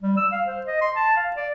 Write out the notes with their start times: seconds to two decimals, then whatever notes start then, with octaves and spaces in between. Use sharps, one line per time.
0.02 G3
0.17 E6
0.32 F5
0.46 C5
0.66 D#5
0.81 C6
0.96 A5
1.17 F5
1.36 D5